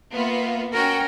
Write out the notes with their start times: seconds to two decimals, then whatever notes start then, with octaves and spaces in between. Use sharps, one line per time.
0.13 A#3 B3 F4 E5
0.73 C#4 F#4 A#4 G5